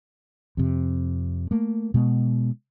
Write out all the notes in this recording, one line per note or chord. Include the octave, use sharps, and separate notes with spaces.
F2 C3
A3 A#3
B2 G#3 B3